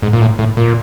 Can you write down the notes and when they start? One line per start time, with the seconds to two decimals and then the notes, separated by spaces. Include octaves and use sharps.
0.02 G#2
0.13 A#2
0.21 A2
0.39 A2
0.57 A#2